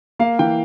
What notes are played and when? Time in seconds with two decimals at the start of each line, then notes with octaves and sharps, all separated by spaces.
0.19 A#3 F5
0.39 E3 G5